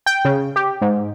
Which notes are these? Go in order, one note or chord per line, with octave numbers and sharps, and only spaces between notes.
G5
C#3
G4
G#2